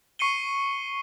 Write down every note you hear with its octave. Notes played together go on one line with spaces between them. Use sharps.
C#6 C7 C#7 D#7 G7